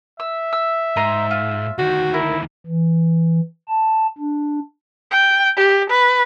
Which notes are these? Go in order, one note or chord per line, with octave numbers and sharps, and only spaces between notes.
E5 E6
E6
G#2 D#5 A#5 C6
F4
D2 D#3 F#4
E4 A#4
E3
A5
D4
G5
G4
B4